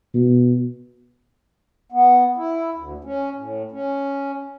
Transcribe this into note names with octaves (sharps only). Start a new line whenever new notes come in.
B2
B3
E4
D2
C#4
A2
C#4